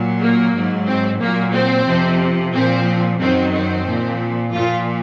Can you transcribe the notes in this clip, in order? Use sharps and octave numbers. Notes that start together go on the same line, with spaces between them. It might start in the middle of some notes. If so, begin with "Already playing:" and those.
Already playing: A#2 F#3
A#3
G#2 F#3
C4
A#2 F#3 A#3
C4
F2 C3 F3
A#2 F3 C4
F#2 D#3 F#3 C4
C4
A#2 F3
A#2 F3 F4